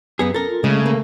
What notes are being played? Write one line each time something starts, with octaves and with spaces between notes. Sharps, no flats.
F#2 B3 G#4
C#4 A4 A#4
F4
C#3 G#3 A3
A#3